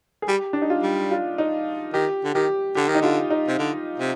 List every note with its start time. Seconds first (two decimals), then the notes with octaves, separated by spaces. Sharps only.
0.22 G#4
0.28 G3 G4
0.53 D4
0.62 D#4
0.70 F4
0.83 G3
1.11 F4
1.38 D#4
1.93 D#3 G4
2.24 D3
2.34 D#3 G4
2.75 D3 G4
2.88 D#3
2.95 D#4
3.01 D3 F4
3.30 D#4
3.48 C3
3.59 D3
4.00 C3